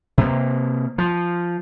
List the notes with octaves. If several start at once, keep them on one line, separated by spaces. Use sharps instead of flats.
C3 A#3
F3